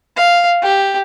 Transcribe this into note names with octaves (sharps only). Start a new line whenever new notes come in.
F5
G4